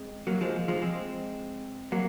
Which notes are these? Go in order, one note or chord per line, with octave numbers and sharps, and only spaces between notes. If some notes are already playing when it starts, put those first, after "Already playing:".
Already playing: G#3 C4
F#3 A#3
F3 G#3
F3 G#3
G#3 C4
F#3 A#3